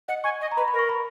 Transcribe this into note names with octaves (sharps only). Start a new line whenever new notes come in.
D#5 F#5
G#5 C#6
D#5
A#5
B4 B5
B5
A#4
C#6
B5